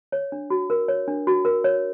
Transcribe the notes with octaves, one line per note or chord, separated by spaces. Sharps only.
C#5
D4
F#4
A#4
C#5
D4
F#4
A#4
C#5